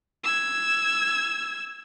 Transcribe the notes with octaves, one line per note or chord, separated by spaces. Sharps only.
E6 G#6